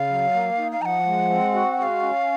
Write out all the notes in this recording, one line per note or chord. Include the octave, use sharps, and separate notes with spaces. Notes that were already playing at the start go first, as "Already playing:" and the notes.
Already playing: C#3 F5
F#3
A#3
D#4
F5
F3 F#5 A#5
G#3
C4
F#4
G#3 F5 F#5
C#4